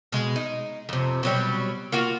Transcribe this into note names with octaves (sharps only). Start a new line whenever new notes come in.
B2 G#3
D#4
F2 C3
B2 F#3 G3
A#3 F4 F#4